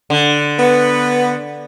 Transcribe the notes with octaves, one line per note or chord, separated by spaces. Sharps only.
D3
B3 B4